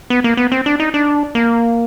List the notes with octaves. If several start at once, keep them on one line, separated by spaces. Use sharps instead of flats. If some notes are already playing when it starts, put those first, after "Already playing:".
B3
A#3
B3
C4
D4
D#4
D4
A#3